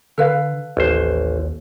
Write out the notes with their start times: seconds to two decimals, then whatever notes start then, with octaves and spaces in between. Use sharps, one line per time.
0.18 D3 A4 B4 F5
0.77 A1 D#2 C5